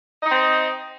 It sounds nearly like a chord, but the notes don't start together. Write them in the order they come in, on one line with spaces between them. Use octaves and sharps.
D#5 D#4 C4